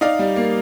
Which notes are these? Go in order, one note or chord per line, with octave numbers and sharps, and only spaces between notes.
D#4 D5 F5
G3
A#3